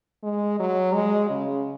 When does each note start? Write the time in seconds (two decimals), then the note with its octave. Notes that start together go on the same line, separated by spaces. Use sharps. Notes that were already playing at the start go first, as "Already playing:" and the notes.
0.23 G#3
0.59 F#3
0.94 G#3
1.30 C#3